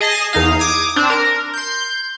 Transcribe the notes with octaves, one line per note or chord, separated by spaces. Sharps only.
G#4 D#5 A5 A6 A#6 C7
E2 D#4 F5
D6 D#6 G#6
C4 D4
A#4
C6 G6